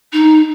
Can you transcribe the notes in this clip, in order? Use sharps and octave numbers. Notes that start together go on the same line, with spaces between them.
D#4